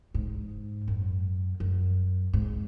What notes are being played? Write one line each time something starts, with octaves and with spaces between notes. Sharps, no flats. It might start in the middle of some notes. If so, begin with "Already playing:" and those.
G#2
F#2
F#2
G#2